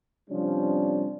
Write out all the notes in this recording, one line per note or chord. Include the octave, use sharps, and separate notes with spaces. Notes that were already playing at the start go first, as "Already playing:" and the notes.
C3 F3 G3 C#4 D4